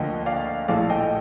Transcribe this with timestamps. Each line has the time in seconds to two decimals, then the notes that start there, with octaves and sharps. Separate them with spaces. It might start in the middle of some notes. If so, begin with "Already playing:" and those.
Already playing: D2 D3 F3 A#3 D#5 G5
0.26 D5 F5
0.68 A#1 A2 F3 A3 D5 F5
0.90 D#5 G5